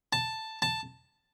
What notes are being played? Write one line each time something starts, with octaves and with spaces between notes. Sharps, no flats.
A5
A5